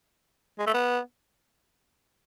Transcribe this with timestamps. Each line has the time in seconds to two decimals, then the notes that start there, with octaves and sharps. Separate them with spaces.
0.59 G#3
0.67 A3
0.74 B3